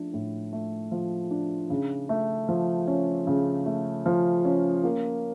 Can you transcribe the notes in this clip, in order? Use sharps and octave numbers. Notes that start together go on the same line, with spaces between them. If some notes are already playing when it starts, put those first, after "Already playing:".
Already playing: F3 A3 D4
A2
A3
F3
D4
C#3
A3
F3
C#4
C#3
A3
F3
C#4
A#3